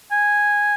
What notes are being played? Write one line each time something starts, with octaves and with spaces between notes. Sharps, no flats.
G#5